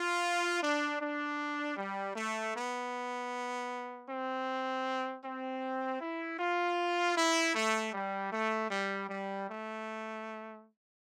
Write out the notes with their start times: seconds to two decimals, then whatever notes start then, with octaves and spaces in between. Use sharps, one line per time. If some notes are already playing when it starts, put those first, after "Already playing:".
Already playing: F4
0.62 D4
1.00 D4
1.77 G3
2.16 A3
2.54 B3
4.08 C4
5.24 C4
6.01 E4
6.39 F4
7.17 E4
7.55 A3
7.94 G3
8.32 A3
8.71 G3
9.10 G3
9.47 A3